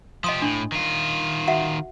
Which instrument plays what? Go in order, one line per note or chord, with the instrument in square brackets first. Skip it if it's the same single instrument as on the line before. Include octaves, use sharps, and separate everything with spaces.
[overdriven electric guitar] F3 G4 [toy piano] D#5 C6 D#6
[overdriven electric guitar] A2 [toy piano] D4
[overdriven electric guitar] D#3 F4
[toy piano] F#4 E5 F#5